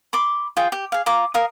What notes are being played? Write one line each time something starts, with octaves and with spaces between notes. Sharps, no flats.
B5 C6 D6
F4 G#4 G5
G4
G#4 F5
F4 A#5 D6
A#4 F5 D#6